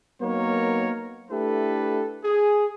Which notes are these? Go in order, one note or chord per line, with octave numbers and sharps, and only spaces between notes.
F#3 A#3 B3 D#4 A#4 C#5
A3 D4 E4 G4 A4 B4
G#4